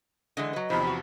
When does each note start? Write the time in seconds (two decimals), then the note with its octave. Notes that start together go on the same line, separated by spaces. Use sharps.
0.37 D3 E3 G#3 D#5
0.53 F#3 B4
0.70 E2 C3 D#3 F3 B5
0.87 F#4